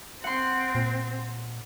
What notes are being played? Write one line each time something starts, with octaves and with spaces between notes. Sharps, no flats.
C4 F#5 C6
A#2